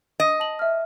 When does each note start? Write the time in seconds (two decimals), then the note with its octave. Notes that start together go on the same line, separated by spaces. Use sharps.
0.20 D#5
0.40 A5 F#7
0.59 E5 F6